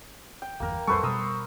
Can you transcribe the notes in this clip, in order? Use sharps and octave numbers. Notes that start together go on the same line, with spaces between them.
G5
G1 E2 A#3 A#4
D1 F2 G3 A4 B4 C5 C#6
B2 G3 A#4 D#6 E6